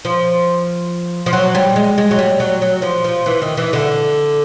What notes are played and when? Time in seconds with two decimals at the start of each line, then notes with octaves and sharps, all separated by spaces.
0.05 F3
1.26 F3
1.33 F#3
1.55 G3
1.76 G#3
1.98 G#3
2.11 F#3
2.19 G3
2.40 F#3
2.62 F#3
2.82 F3
3.04 F3
3.26 E3
3.42 D#3
3.57 E3
3.73 D3